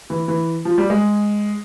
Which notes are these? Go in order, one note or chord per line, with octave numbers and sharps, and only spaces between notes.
E3
E3
F3
G3
G#3